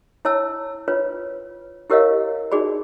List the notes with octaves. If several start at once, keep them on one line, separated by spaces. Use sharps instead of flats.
E4 C#5 A5 E6
F4 B4 C#5
E4 G4 A#4 C#5 D#5 F5
D#4 F#4 G#4 D5 B5